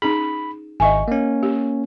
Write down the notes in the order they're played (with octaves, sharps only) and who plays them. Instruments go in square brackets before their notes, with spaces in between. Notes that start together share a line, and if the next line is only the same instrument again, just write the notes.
[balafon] C#4 D#4 G#4 [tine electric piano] B5
[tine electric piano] G#1 C#6 [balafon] D#5 E5 G#5
[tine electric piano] A#3 C#4
[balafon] G4